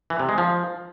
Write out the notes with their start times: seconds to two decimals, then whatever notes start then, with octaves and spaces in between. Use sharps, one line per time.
0.10 E3
0.19 C3
0.29 G#3
0.38 F3